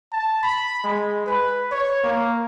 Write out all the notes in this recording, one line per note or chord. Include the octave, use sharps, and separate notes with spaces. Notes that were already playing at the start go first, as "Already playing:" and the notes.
A5
B5
G#3
B4
C#5
A#3